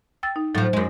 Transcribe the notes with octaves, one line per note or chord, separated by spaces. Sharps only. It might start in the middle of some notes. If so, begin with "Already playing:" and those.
G5 E6 A6
D#4
A2 F3 F#3
F#2 G#3